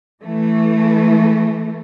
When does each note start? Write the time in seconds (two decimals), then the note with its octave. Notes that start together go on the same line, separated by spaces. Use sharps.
0.22 E3 A3